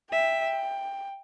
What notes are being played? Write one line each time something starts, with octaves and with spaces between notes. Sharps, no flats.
E5 G5